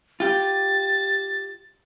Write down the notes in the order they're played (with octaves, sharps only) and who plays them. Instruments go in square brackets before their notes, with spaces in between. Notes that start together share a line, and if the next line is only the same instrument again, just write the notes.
[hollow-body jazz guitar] F4 G4 [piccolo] A6